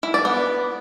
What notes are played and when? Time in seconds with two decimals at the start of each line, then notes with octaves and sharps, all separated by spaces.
0.03 E4
0.14 D5
0.25 B3